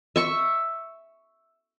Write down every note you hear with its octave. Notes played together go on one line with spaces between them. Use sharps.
E5 C#6